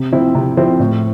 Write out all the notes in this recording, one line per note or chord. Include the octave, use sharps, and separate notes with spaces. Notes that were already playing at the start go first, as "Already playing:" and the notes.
Already playing: C3
F3 C4 E4
C3
F3 C4 E4
A2